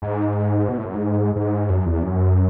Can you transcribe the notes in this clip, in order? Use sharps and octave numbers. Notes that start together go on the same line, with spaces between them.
G#2
B2
A2
F#2
G#2
G#2
F#2
E2
F#2